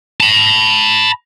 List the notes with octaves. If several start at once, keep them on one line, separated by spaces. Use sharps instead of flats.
A5 B5